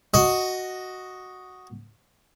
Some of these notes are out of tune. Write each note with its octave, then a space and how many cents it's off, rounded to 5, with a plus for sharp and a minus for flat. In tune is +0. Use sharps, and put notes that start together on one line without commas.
F#4 +0 D#5 +0